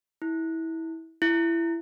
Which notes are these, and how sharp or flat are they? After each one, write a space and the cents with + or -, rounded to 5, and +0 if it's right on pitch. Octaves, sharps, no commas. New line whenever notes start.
E4 -20
E4 +20